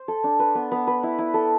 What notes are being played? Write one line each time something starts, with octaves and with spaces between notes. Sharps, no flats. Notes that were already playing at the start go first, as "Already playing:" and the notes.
Already playing: C5
A4
D4
B4
B3
B3
B4
E4
E4
A4